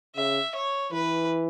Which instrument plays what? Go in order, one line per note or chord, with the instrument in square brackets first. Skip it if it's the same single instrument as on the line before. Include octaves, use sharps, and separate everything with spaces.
[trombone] C#3 [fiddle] E5
[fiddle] C#5
[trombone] E3 [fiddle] B4